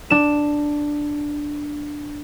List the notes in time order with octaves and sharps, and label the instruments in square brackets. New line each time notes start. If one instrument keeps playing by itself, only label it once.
[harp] D4 E7